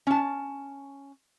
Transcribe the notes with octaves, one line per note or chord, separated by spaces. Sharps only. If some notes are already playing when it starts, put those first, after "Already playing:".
C#4 A5